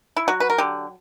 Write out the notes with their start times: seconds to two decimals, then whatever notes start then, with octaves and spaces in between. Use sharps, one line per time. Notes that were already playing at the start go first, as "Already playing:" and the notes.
0.16 E4
0.28 F#3 F#4
0.40 B4
0.50 A#4
0.58 D3 G4